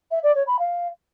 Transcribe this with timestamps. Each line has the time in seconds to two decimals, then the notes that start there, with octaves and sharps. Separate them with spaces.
0.11 E5
0.23 D5
0.35 C#5
0.47 B5
0.59 F5